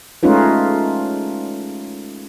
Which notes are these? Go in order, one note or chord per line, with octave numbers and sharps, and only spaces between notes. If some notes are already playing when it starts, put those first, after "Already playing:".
G#3 A3 C#4 D#4 F4 B4